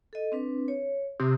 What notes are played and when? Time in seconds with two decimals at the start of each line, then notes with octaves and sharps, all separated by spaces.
0.13 A4 D#5
0.32 C4 D4 B4
0.68 C#5
1.20 C3 D#6